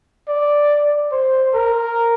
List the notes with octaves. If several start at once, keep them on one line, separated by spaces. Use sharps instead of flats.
D5
C5
A#4